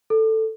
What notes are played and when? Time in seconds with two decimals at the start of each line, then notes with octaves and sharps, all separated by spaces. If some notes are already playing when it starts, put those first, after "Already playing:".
0.10 A4